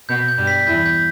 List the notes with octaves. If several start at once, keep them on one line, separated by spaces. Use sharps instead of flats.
B2 B3 G6
G6
G2 G3
B6
E2 E3 G6
G6